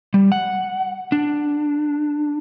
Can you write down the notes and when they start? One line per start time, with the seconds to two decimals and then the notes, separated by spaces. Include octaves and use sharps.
0.14 G3
0.32 F#5
1.12 D4